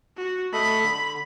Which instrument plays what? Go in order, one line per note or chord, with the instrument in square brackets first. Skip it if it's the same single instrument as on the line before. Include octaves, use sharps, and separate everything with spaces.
[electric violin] F#4
[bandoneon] A3 A4 D#5 [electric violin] B5
[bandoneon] D3